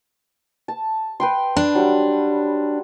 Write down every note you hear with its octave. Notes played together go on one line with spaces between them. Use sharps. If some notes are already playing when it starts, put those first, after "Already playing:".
A5
B4 G5 C6
D4
F#3 G3